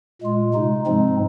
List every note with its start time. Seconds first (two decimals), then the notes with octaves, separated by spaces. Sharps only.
0.22 A#2 G#3 F4
0.54 C3 G#3 D#4
0.86 G#2 F3 G#3 C4 D#4